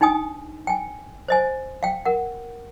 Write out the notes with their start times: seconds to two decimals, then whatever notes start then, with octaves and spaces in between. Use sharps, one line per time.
0.01 D4 D#4 G5 G#5 D#6
0.67 G5 G#5
1.28 C5 D#5 G#5
1.83 F5 G5
2.05 A#4 F#5